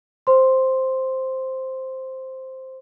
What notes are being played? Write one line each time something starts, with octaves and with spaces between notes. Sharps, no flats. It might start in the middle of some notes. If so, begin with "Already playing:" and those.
C5 C6